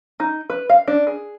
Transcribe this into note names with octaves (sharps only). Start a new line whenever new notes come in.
D#4
B4
F5
D4
G#4